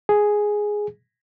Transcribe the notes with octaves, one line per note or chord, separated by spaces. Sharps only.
G#4